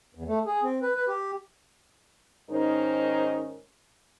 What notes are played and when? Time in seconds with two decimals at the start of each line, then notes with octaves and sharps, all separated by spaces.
0.15 E2
0.28 A3
0.46 G#4
0.63 C4
0.82 B4
0.95 B4
1.08 G4
2.50 G#2 D#3 C#4 D#4 A#4 C5